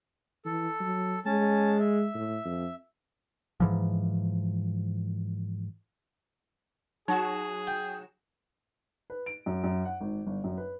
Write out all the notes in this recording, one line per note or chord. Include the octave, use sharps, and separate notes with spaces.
E3 A4
F#3
G#3 C#4 A5
E5
A2
F2
G#2 E3 F3
F#3 D#4 F#4 G#4 E7
G5
B4
D7
F#2
F#2
F#5
G#1
G1
F#2
B4